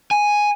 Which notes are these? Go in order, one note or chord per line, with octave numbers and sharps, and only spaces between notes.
G#5